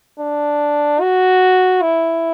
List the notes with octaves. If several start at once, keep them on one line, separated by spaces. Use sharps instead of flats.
D4
F#4
E4